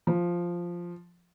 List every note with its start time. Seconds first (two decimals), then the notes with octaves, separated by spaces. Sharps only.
0.07 F3